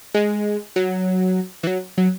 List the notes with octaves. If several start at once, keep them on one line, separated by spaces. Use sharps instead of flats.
G#3
F#3
E3
F#3
F#3